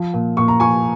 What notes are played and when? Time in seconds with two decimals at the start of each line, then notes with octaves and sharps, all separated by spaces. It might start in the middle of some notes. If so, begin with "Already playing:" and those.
Already playing: F3
0.14 A#2
0.37 A#2 C#6
0.48 A#5
0.60 F3 G#5 C#6